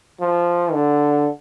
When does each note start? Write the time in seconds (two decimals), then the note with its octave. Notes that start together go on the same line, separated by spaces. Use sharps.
0.21 F3
0.73 D3